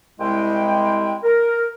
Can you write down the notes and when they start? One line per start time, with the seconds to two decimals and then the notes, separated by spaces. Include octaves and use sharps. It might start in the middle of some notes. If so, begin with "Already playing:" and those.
0.20 C2 G#3 E4 G5
1.24 A#4